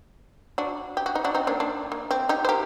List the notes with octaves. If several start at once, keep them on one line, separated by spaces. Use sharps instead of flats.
D4 F#4
G4
F#4
D#4
D4 F#4
C4 D#4
A#3 D4
A#3 D4
A#3
C4
D#4 G4
C5
G4 A#4